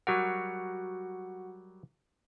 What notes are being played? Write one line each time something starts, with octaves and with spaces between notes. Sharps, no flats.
F#3 G3 F#4 A#4 F#5